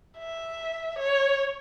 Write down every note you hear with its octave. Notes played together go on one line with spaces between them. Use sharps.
E5
C#5